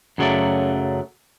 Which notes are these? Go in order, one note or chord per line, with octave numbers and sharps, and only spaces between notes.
F#2 C#3 F#3 A3 D5